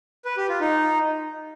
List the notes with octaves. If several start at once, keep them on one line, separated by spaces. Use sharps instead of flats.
B4
G4
F4
D#4